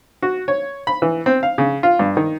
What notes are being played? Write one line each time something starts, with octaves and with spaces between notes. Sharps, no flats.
F#4
C#5
B5
E3
C4
F5
C#3
F4
G2
D#3